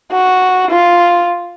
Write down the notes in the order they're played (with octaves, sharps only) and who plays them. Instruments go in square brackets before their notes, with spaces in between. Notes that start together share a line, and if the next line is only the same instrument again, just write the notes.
[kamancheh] F#4
F4